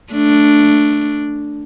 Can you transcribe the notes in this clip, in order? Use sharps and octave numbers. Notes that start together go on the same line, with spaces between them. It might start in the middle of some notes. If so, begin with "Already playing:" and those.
A3 D4